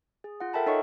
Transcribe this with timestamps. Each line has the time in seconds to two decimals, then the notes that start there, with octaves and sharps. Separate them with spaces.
0.24 G#4
0.40 F4 F#5
0.53 A4 A#4 E5 G5 A5 B5
0.66 D#4 A4 C#5 D#5 E5 C#6